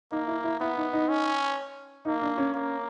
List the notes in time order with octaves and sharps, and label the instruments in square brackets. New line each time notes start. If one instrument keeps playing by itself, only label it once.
[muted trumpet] A#3 [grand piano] D#4
[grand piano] E4
E4
[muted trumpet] B3 [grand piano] E4
[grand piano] D#4
D#4
[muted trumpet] C#4
[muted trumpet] A#3 [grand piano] D#4
[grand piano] D4
C#4
[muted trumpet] A#3